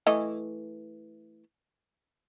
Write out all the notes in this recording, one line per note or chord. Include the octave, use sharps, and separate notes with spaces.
E3 A3 D#5